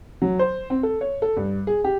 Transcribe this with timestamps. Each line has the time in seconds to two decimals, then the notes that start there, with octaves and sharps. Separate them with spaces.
0.22 F#3
0.39 C5
0.70 C4
0.83 A4
1.01 C#5
1.22 A4
1.37 G2
1.67 G#4
1.84 G4